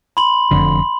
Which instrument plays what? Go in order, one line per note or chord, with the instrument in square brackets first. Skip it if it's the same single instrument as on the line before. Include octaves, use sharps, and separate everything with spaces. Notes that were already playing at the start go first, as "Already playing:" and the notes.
[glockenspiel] B5 C6 F#7
[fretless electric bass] F1 F2 D3